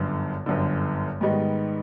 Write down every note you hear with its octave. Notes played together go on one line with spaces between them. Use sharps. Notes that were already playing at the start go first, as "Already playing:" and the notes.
Already playing: G1 F#2 D3
G1 F#2 D3
G#2 D#3 G3 B3 D#4